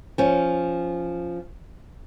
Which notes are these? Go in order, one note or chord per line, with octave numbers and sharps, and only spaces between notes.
F3 C#4